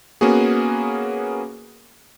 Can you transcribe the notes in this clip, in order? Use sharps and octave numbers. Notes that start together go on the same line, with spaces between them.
A#3 B3 C#4 F#4 G#4